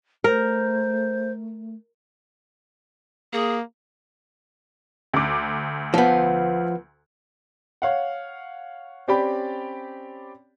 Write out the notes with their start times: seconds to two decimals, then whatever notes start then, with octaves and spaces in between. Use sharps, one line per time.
0.24 A3 A#4 C5
3.33 A#3 G#4
5.13 D2 D6
5.94 F3 B3
7.82 C#5 F5 F#5
9.08 C4 C#4 G4 D5 G5 B5